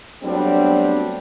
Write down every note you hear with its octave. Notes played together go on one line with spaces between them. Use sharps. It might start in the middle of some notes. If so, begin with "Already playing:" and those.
F#3 G3 A3 B3 C4 D4